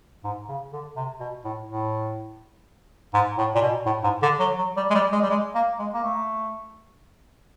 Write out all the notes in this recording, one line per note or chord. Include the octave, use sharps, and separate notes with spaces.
G#2
C#3
D3
C3
B2
A2
A2
G#2
A2
A#2
B2
A2
G#2
D3
F#3
F#3
G3
G#3
G3
G#3
G3
G#3
A#3
G#3
A#3
A3